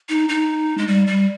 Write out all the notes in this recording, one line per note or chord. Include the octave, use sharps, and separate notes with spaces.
D#4
D#4
G#3
G3
G3